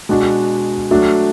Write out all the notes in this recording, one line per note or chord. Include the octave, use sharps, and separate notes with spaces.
B2 G#3 D4 F#4
F#3 A3 D4 F#4